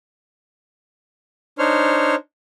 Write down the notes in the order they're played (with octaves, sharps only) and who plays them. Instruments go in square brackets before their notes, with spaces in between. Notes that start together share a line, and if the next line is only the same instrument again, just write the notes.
[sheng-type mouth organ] D4 D#4 C5 C#5 F6